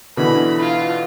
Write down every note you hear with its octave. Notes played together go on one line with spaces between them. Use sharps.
B2 D3 E3 B5
F4